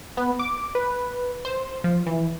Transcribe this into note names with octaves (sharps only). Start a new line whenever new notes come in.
B3
D6
B4
C5
F3
E3